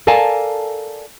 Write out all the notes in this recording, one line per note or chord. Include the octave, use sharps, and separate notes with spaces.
A4 A#4 D5 F5 G#5 A5